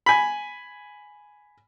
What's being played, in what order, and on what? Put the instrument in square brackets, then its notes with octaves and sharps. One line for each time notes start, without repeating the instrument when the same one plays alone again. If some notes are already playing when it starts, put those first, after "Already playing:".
[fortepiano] G#5 B5